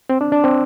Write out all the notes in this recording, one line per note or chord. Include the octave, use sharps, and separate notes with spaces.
C4
D4
D4
C4